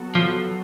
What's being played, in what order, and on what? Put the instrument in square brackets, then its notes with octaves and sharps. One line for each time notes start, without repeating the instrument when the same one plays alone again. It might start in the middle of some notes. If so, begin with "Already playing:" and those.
Already playing: [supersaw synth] F#3 B3 F#4 A4
[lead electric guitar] F3